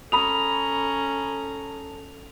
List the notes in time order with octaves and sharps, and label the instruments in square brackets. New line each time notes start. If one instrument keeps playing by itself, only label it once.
[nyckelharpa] C#4 A#5 [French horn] A4 [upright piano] B5 D#6 [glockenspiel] F7